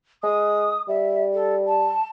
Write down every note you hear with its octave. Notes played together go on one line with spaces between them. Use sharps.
G#3 D#6
G3 E5
A4
A5